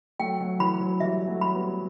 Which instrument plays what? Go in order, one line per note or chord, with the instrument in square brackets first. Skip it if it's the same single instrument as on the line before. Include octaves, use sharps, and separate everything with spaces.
[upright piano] F#3 A3 [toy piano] G5
[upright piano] F#3
[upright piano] E3 [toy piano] B5
[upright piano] F#3
[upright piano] E3 G3 [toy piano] E5
[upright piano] F#3 A3
[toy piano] B5
[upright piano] G3 B3